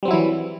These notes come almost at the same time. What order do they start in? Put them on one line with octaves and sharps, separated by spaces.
G3 C4 F#3 E4 E3